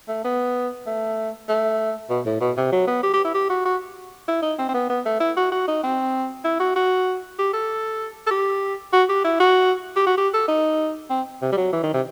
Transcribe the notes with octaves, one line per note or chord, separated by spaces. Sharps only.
A3
B3
A3
A3
B2
A2
B2
C3
F#3
B3
G4
G4
E4
G4
F#4
F#4
E4
D#4
C4
C4
B3
B3
A3
E4
F#4
F#4
D#4
C4
E4
F#4
F#4
G4
A4
A4
G4
F#4
G4
E4
F#4
G4
F#4
G4
A4
D#4
C4
C3
G3
F#3
E3
D#3
C3